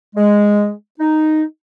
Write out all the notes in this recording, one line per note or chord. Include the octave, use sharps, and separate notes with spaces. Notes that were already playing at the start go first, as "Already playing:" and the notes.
G#3
D#4